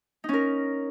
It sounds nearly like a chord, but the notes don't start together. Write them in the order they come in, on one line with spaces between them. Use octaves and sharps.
D#4 C#4 A#4